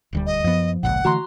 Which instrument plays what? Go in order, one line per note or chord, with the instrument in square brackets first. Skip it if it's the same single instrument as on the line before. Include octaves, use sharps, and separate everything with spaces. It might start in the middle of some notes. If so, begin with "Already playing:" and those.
[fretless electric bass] D#1 D2 G3
[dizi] D#5
[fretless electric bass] F#2 B3 [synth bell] F3
[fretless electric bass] G#1 C#2 A#2 [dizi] F#5
[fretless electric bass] D3 E3 A3 [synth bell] F#4 A#5 C6